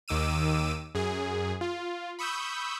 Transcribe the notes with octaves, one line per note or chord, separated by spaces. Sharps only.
D#2 D#3 D6 E6 D#7
F#2 G#4
F4
B5 C#6 D#6 E6 G6